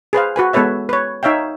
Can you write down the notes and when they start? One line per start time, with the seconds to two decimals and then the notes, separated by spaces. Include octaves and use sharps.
0.13 G#4 B4 C5 F5
0.36 F#4 B4 G#5
0.53 G#3 B3 A4 B4 C#5 E5
0.89 B4 C#5
1.23 D#4 C#5 E5 F5 G5